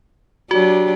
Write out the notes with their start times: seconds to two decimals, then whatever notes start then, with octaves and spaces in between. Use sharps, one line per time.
0.51 F#3 D4 F#4 G4